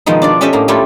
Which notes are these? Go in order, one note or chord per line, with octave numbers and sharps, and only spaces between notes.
B2 D#3 F3 G#3 D#4
D4 F4 D5
C#4 G4 A4 D#5 E5 A5
A2 A#3 A#5
G3 A3 E4 F4 G4